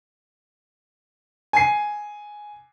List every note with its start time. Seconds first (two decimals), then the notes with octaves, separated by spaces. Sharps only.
1.53 G#5 C7